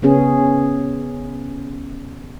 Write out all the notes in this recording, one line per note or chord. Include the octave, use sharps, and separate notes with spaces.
C#3 B3 C#4 G#4